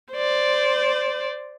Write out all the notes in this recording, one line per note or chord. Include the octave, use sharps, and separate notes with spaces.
C5 D5